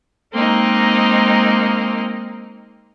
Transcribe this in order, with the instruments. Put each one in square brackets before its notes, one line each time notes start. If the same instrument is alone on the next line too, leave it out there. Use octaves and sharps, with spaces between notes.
[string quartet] G#3 A#3 C4 D#4